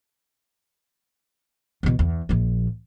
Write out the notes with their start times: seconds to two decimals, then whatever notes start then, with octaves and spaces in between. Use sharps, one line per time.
1.83 E2 B2
1.99 E2
2.29 A#1 F3